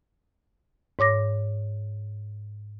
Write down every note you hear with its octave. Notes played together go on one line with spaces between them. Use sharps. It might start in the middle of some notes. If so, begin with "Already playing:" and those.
G#2 C#5 D6 A#6